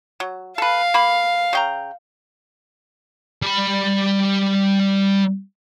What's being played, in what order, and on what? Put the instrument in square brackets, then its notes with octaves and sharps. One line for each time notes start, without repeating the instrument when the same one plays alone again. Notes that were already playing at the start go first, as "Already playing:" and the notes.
[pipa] F#3
[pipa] A4 B4 [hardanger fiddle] F5
[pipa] A#3 B5
C#3 G5 A#5
[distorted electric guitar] G3 B5